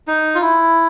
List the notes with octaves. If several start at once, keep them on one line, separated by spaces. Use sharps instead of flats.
D#4
F4
E4